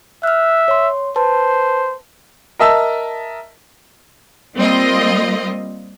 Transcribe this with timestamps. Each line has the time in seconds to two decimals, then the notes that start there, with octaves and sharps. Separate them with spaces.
0.23 E5 F6 F#6
0.68 C#5 C6
1.16 B4 C5 A5
2.59 A#4 D#5 E5 A5 E6
4.55 G3 A#3 C4 F4 D#5